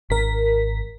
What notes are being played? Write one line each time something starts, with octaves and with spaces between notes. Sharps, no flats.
G#1 A#4 B6